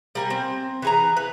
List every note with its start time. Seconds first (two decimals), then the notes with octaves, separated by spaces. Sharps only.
0.15 G3 A#4 G#5
0.30 C4
0.82 E3 G#4 A#5
1.17 B4